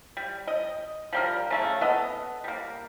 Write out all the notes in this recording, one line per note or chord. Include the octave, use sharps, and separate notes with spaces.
G3
D#5
F3 G3 A#4
C#3 A3 A#3
B3 A4 D#5
G3 A#3